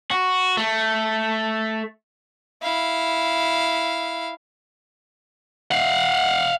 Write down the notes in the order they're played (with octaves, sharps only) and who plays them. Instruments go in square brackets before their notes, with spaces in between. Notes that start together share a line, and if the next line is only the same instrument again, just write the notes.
[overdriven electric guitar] F#4
A3
[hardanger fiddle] E4 F5
[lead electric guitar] F5 F#5